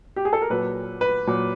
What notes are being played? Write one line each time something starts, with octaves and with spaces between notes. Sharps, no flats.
G4
G#4
A4
A#4
A#2 F#3 B4
B4
A#2 F#3